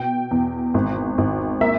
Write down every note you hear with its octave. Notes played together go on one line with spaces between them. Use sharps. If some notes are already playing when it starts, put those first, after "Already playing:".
Already playing: B2 G5
E2
G#1
G#1
A#3 E5